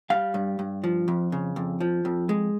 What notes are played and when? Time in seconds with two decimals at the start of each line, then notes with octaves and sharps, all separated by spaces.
0.10 G3 F5
0.34 G2
0.59 G2
0.84 F3
1.08 F2
1.32 C#3
1.56 F2
1.80 F3
2.05 F2
2.29 G#3